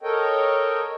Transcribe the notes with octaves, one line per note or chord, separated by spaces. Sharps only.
A4 A#4 C#5 D#5 G5